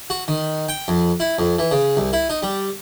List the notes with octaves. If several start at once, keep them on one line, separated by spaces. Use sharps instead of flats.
F#4
D#3
G5
F2
E4
F2
E3
C#3
C2
E4
D#4
G3